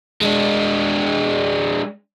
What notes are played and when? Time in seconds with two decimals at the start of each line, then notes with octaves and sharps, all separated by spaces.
0.22 G#3 D4